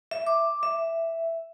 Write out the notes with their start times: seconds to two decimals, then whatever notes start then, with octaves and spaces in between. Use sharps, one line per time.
0.11 E5
0.27 D6
0.63 E5